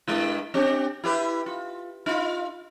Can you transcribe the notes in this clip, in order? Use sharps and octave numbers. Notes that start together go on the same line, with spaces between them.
G2 G#3 E4
C4 D4 G4
E4 G4 B4
F4
D#4 F4